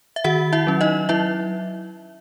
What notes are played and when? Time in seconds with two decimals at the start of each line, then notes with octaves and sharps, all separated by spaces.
0.16 E5
0.24 D#3 F#4 F#5
0.53 E4 E5
0.67 F#3 C#4
0.81 D#4 D#5
1.09 F#3 E4 E5